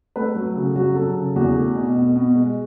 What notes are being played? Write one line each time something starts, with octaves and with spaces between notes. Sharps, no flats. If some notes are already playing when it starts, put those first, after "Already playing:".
A3 B4
F#3
C#3 F#4
F#3 F#4
F#3 A4
C#3
E2 F#4
A3
B2
B2
B2
G#3